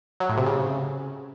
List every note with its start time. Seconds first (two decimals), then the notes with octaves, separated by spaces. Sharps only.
0.20 F#3
0.29 A2
0.38 C3
0.46 C#3